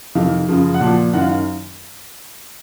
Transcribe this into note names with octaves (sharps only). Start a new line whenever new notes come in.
F2 C3 D#3 F5
F#2 C#3 F3
F#5
A#2 F3 A5
F#2 D#3 F#5
F5